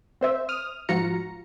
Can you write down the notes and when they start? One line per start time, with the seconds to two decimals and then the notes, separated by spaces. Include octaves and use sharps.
0.21 C4 C5 E5
0.49 D#6 F6
0.89 G#2 F3 F4 F#4 A#5 C#7